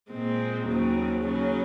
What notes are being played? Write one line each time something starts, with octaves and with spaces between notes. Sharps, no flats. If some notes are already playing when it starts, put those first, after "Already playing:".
A#2 G#3 C4
D#2 C#3 F#3 C4
C#3 F#3 C#4